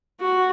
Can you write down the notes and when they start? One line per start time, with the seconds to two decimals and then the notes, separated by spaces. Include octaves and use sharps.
0.21 F#4